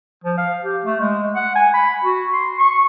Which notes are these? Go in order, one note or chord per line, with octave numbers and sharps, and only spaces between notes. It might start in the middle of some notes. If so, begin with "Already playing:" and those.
F3
F5
G4
A3
G#3
F#5
G#5
B5
F#4
C6
C#6